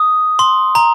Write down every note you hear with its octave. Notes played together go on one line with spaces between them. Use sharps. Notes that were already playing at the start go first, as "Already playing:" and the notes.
Already playing: D#6
C6
A#5